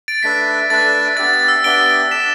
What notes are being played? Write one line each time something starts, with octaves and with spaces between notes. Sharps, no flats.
A6 D7
A3 D4 B4 E5 B6
A3 D4 B4 E5 A6
B3 D4 G4 E5 A6
A6
E6
B3 D4 G4 E5 D7 G7
D4 A4 E5 B6 E7